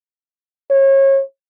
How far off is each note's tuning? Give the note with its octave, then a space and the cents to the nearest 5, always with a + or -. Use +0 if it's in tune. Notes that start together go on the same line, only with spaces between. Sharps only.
C#5 -30